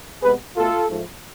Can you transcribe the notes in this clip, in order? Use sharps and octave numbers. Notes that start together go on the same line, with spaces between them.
C3 G#3 B3 G#4 B4
B2 A3 F4 A4
G#2 F3 A3